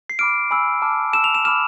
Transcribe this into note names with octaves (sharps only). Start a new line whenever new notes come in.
C7
B5 D6 F6 D7
G#5 B5 E6
A5 D6 F6
A5 E6 E7
F7
E7
B5 D6 F6 E7